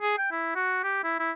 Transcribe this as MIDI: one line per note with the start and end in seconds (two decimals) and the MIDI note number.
0.02 0.17 68
0.18 0.31 79
0.31 0.53 64
0.56 0.82 66
0.84 1.00 67
1.04 1.17 64
1.19 1.31 64